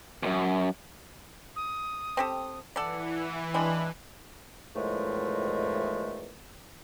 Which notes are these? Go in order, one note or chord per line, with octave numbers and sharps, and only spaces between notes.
C#2 F#2
D#6
C4 G4 A4
E3 A4 D5 F#5
G3 G#3 D4 B5
E2 A2 D#3 F3 G#3 A3